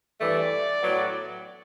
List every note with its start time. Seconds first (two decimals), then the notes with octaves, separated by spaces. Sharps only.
0.20 G2 E3 A3 D5
0.82 A2 F#3 B3